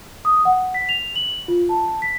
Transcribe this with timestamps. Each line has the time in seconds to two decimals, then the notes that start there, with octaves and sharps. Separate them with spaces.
0.25 D#6
0.45 F#5
0.74 B6
0.89 F7
1.15 F#7
1.48 F4
1.69 A5
2.02 B6